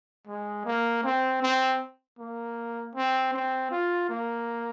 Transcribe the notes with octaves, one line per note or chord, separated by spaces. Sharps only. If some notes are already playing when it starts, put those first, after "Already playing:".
G#3
A#3
C4
C4
A#3
C4
C4
F4
A#3